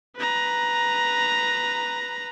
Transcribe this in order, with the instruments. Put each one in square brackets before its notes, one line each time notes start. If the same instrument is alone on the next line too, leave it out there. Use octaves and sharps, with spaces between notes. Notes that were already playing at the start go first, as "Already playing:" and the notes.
[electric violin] B4 A#5